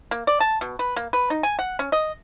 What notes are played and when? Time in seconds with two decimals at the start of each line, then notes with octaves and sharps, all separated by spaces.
0.11 A#3
0.27 D5
0.40 A5
0.61 B2
0.79 B4
0.96 A#3
1.13 B4
1.30 D#4
1.43 G#5
1.59 F#5
1.79 C#4
1.92 D#5